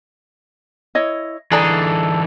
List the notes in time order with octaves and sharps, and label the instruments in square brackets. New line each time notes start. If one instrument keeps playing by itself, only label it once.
[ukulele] E4 C#5 D#5
[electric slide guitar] D3 E3 [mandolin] D4 G#4 A4 [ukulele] D5 A#5